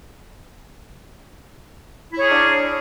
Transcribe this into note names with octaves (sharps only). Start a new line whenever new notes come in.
D4 E4 G#4 A#4 C#5